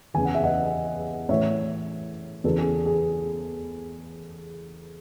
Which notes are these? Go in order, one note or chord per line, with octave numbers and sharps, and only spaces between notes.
E2 C#3 E3 G#5
F#5
E5
D#5 F#5
A2 E3 C#5 E5
E2 C#3 E3 A4
G#4
G#4